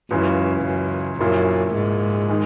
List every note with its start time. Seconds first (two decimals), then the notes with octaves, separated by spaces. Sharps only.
0.11 C#2 F#2 C#3 E3
0.65 F#2
1.20 A#1 F#2 A#2 A#3 E4
1.75 G#2
2.29 D#3 G#3